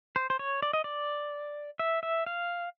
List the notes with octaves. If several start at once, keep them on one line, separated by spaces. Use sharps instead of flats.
C5
C5
C#5
D5
D#5
D5
E5
E5
F5